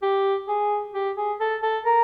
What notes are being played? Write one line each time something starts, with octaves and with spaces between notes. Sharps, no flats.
G4
G#4
G4
G#4
A4
A4
A#4